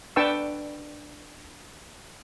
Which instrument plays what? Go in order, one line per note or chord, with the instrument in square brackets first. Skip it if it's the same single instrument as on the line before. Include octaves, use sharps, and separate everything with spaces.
[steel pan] D4 B4 G5 A5 C#6 E6